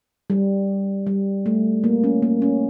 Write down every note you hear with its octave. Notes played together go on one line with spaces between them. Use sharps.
G3
G3
A3
A#3
C#4
A#3
C#4